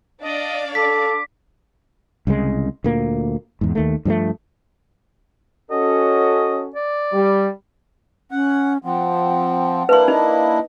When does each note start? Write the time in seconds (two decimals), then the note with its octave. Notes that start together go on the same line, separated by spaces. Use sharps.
0.21 D4 D5 D#5 F5
0.75 A4 D6 B6
2.27 C2 C#3 G3 G#3
2.84 D2 A#2 A#3
3.61 E2 G#2
3.75 D#2 D#3 A3
4.05 G2 F3 G3 A3
5.71 C#4 F#4 A4 D#5
6.75 D5
7.12 G3
8.31 C#4 F#5
8.85 F3 C4 F#5
9.89 A#3 D4 E4 B4 C6
10.08 D#4 D#5